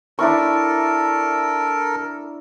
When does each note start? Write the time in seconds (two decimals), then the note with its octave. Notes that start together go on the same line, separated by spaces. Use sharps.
0.19 D4 E4 A4 A#4 C#6